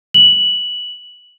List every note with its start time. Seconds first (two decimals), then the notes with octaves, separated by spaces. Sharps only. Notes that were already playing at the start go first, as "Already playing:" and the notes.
0.14 F#7